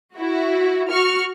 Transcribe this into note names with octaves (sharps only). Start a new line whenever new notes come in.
E4 F#4
F#4 C#6 F6